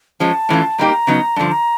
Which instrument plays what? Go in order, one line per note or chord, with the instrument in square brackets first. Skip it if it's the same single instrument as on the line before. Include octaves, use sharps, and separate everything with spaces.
[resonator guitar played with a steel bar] F3 G#3 C#4 [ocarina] A5
[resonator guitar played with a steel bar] A2 E3 A3 C#4 F4
[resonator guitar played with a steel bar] A#2 G3 A#3 D#4 G4 [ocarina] A#5
[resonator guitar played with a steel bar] C#3 F#3 B3 D#4
[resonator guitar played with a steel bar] G2 D3 F3 [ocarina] A5
[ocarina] A#5